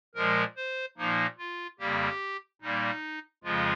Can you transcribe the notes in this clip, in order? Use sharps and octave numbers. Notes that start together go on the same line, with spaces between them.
A#2 F3 G#3 A#4
C5
A#2 F3 A#3 D#4
F4
F2 C#3 G3 A#3 G4
A#2 G3 A#3 D#4
F2 C#3 F3 G#3 F4